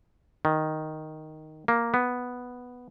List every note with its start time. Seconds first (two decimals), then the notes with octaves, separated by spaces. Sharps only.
0.45 D#3
1.68 A#3
1.94 B3